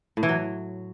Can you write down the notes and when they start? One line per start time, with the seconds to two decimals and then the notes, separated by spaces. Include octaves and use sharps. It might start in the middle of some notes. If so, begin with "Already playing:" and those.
0.17 A2
0.23 E3
0.29 F#3